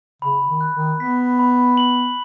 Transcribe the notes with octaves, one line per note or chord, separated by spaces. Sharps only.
C#3 B5
D#3
F#6
D#3
B3 B6
B5
F#7